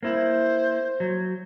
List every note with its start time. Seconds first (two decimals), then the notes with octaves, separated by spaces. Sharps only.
0.03 A#3 E4 C5
1.00 F#3